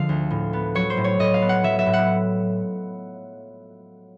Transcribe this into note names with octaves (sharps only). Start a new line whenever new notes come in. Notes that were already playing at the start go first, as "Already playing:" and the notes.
Already playing: D3 F3 G#3 F5
D2
A2
B3
F#3 C#5
C5
A2
C#5
A2 D#5
F5
B3
F#5
F#3 E5
E5
A2
F#5